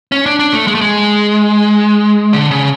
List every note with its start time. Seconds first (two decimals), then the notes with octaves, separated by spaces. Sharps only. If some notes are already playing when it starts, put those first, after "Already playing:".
0.12 C#4
0.26 D4
0.39 D4
0.53 A3
0.67 G#3
0.75 A3
0.81 G#3
2.33 D3
2.51 C#3